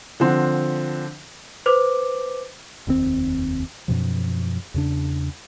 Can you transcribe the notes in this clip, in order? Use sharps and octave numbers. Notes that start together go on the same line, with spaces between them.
D3 F3 C4 F#5
B4 C5 D6
F1 D#2 C3 C4
F#2 B2 F3
E2 C#3 D4